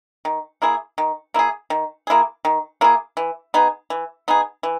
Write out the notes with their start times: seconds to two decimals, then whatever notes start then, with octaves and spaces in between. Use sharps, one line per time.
0.25 D#3
0.62 A#3 E4 G#4
0.98 D#3
1.34 A#3 E4 G#4
1.70 D#3
2.07 A#3 E4 G#4
2.45 D#3
2.81 A#3 E4 G#4
3.17 E3
3.54 B3 D#4 G#4
3.90 E3
4.28 B3 D#4 G#4
4.63 E3